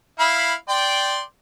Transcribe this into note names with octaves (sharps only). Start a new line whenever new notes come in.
E4 F5 B5
D5 G5 C6